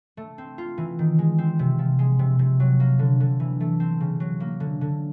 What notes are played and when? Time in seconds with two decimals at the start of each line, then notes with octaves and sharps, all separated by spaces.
0.17 A3
0.38 C4
0.58 F4
0.78 E3
0.99 D#3
1.18 G#3
1.38 C4
1.59 C3
1.79 F3
1.99 G#3
2.19 C3
2.39 C3
2.60 F#3
2.80 A#3
2.99 D3
3.20 D3
3.40 E3
3.60 A3
3.80 C4
4.00 C#3
4.20 F#3
4.40 A#3
4.60 D3
4.81 D3